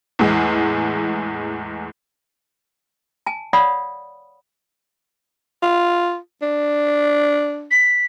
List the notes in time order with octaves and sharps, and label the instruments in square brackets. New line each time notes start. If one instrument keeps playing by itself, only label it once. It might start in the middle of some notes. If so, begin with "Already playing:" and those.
[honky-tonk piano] E2 A2 G#3
[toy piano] G#5 A5
C#5 D5 F5 F#5 B5 D#6
[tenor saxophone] F4
D4
[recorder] B6